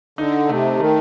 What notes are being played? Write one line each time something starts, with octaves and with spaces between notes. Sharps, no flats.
D3 D#4
C3 A3
D#3 A3